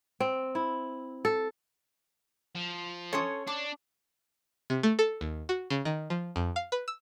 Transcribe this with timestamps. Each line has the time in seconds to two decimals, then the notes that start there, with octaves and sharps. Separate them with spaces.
0.20 C4
0.55 E4
1.25 A4
2.55 F3
3.13 C#4 A4 C#5 C6 D#6
3.47 D4 D6
4.70 C3
4.83 A3
4.99 A4
5.21 D#2
5.49 F#4
5.70 C#3
5.85 D#3
6.10 F3
6.36 F2
6.56 F5
6.72 B4
6.88 E6